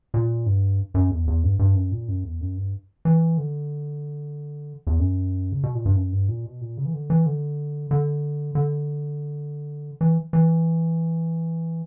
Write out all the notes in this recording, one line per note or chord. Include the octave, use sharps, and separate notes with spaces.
A#2
G2
F#2
E2
E2
G2
G2
F#2
A#2
F#2
E2
F#2
G2
E3
D3
E2
F#2
C#3
B2
A#2
G2
F#2
G2
A#2
B2
A#2
C#3
E3
D3
E3
D3
D3
D3
E3
E3